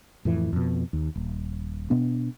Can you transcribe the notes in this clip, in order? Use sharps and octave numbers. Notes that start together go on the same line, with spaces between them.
F2 A2 E3
F2 B2
D#2
D#1
B2 B3 D4